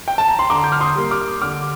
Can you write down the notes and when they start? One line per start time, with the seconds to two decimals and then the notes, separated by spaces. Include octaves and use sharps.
0.08 G5
0.18 A5
0.29 A#5
0.39 C6
0.50 D3 A#5 D6
0.64 G6
0.72 F6
0.80 C6 D#6
0.95 G3 A#3
1.11 D6 F6
1.42 D3 D6 F6